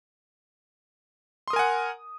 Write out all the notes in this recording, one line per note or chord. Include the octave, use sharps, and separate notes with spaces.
A#4 F#5 G#5 C6 D#6